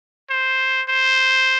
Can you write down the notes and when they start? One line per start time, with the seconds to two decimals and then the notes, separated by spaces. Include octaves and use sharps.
0.30 C5
0.89 C5